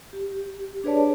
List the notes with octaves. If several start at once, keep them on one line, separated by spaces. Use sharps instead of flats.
G4
D4 G#4 B4 C#5 D5 A5